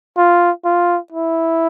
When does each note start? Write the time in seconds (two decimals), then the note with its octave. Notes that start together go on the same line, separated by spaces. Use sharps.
0.18 F4
0.65 F4
1.12 E4